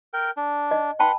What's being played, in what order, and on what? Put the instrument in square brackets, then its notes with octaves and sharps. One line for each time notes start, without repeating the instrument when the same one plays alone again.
[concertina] A#4 G5
D4
[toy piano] D#5
[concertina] B4 F#5 C6 [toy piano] G5 A5 B5